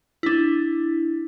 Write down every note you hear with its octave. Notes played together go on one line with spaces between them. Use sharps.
D4 E4